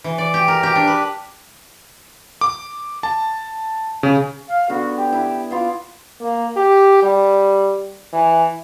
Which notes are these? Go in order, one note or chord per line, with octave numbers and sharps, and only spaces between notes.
E3
D5
G4
A#4
G4
D4
B4
D6
A5
C#3
F5
D3 B3 F#4
G4
E4 B4
B3 F4 D6
A#3
G4
G3
E3